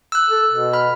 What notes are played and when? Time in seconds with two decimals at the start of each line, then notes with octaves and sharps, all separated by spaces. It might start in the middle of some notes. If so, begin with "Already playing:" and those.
0.12 E6 F#6
0.30 A4
0.51 B2
0.73 B5 F6